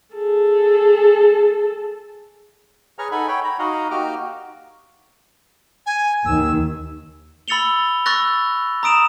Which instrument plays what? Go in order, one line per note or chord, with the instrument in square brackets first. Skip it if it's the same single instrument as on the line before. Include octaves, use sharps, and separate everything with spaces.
[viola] G#4 A4
[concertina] G#4 B4 C#5 A#5 C#6 F6
D#4 A4 F#5 G#5 B5
C#5 G5 B5
A#5 B5
D#4 F#4 D#5 F5 F#5 A#5
A#3 D#4 F#4 G4 D6 F6
[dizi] G#5
[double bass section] D#2 D#3 [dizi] E6
[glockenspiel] B5 E6 A6 C#7 F7 G7
B5 C#6 E6 F#6 A6 A#6
A#5 D#6 D7 E7 F7